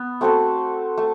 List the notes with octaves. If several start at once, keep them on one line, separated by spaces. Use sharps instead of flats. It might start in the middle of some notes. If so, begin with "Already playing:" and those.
Already playing: B3
A3 C4 F#4 A4
A3